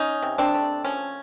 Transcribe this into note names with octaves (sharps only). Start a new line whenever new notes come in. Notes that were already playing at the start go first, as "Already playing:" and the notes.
Already playing: C#4 D#4
C3
C4 D4
A3
F3 C#4